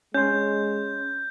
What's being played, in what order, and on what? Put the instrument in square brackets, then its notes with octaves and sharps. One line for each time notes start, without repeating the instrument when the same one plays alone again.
[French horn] G#3 [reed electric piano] C#4 C6 [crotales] G6